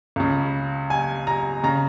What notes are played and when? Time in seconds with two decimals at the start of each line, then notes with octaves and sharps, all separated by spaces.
0.16 C#2 C#3
0.90 G#5
1.27 A#5
1.63 C#3 A#5